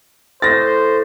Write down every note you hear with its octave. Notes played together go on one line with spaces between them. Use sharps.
A2 C5 A6 A#6